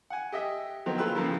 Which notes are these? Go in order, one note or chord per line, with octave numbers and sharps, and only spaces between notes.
F#5 G#5
G4 D#5 E5
D#3 F3 F#3 B3 C4
A#3 F4 G#4 B4 E6
A2 C#3 E3 F3 G3 A#3